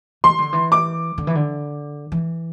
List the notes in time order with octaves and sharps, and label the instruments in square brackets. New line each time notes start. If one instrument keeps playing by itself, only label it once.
[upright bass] E3 [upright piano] C6
[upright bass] D3
E3
[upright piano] D6
[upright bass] D3
E3
D3
E3